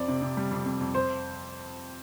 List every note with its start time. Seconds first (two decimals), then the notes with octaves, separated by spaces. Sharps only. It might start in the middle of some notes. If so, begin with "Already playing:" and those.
Already playing: F2 C4 D5
0.08 C3
0.22 C3
0.37 G3
0.51 F2
0.66 F2
0.81 F2
0.94 C5